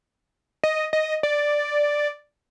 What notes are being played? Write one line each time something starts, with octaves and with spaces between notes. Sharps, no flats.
D#5
D#5
D5